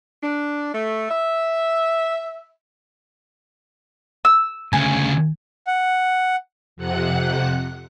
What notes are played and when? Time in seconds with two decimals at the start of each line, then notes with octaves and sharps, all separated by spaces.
0.23 D4
0.73 A3
1.10 E5
4.25 E6
4.73 D2 C#3 G#5
5.67 F#5
6.76 F2 C3 F#5 F#6